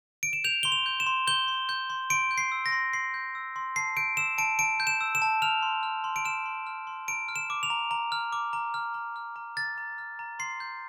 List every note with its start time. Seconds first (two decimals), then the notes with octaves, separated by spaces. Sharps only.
0.23 D7
0.33 E7
0.44 G6 F7
0.63 C6 G7
0.72 F7
0.86 G6
1.00 E7
1.07 C6
1.27 G6 G7
1.48 C6
1.69 G6
1.90 C6
2.10 C6 D7
2.31 G6
2.38 C7
2.52 E6
2.66 A#6
2.72 C6
2.93 C6 C7
3.14 G6
3.35 E6
3.56 C6
3.76 A5 C7
3.97 G6 D7
4.17 E6 E7
4.38 A5 D7
4.59 A5 D7
4.80 G6
4.87 E7
5.01 E6
5.15 E7
5.22 A5
5.42 F6 F7
5.63 C6
5.83 F6
6.04 C6
6.16 D7
6.25 F6 E7
6.46 C6
6.67 F6
6.87 C6
7.08 A#5 D7
7.29 F6
7.36 E7
7.50 D6
7.63 F7
7.70 A#5
7.91 A#5
8.12 F6
8.33 D6
8.53 A#5
8.74 F6
8.94 A#5
9.16 F6
9.36 A#5
9.57 F6 A6
9.78 A#5
9.98 F6
10.19 A#5
10.39 C6 C7
10.60 G6